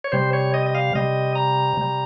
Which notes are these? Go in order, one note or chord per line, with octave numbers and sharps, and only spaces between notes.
C#5
C3 G3 C5
C#5
D#5
D#5
F5
C3 G3 D#5
A#5
C3 G3